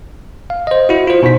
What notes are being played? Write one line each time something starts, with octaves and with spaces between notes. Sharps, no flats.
F5
C5 D#5
E4 F#4
F4 C5
B2 D#4 C5 B6